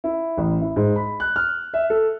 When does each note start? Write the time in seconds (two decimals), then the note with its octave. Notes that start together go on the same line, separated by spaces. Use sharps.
0.04 E4
0.38 A1
0.61 E4
0.76 G#2
0.96 B5
1.20 F#6
1.36 F6
1.74 E5
1.90 A4